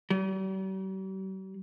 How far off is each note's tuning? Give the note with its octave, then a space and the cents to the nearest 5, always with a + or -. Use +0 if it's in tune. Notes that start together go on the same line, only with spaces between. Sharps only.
G3 -45